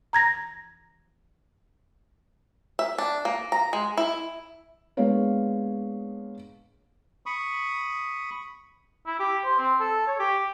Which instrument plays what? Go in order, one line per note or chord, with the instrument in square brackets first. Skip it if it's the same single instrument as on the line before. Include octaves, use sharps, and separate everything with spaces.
[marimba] A#5 G#6 A#6
[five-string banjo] E5
D4
A#3
A#5
G#3
E4
[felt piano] G#3 A#3 B3 D4 C#5 F5
[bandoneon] B5 C#6 D#6
[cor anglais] E4
G4
C5
C4
A4
C#5
G4